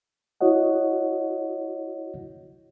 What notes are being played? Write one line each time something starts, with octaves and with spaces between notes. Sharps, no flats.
E4 F#4 C#5 D#5 F#5